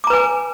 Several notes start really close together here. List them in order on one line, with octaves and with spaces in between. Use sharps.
D6 A#5 B4 G#5